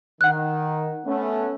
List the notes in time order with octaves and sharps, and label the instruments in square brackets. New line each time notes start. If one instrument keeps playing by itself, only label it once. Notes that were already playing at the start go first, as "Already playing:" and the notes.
[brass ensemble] D#3 [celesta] F#5 F#6
[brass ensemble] A3 B3 C#4